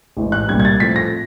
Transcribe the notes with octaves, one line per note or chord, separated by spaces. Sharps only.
A1 G#2 E3
F#6
C2 A#2 G3 G#6
G#6
A6
A2 F3 A3 C4 B6
A#6